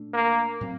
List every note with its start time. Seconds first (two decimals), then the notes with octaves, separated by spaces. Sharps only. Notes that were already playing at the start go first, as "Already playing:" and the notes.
Already playing: A#2 A3 D4
0.13 A#3
0.61 A2 F#3 C4